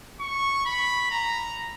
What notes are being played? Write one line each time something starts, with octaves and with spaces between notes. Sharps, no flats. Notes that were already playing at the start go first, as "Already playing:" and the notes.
C#6
B5
A#5